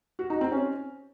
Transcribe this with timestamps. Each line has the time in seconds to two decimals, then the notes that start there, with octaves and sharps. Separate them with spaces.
0.19 F#4
0.30 D#4
0.41 C4
0.52 C#4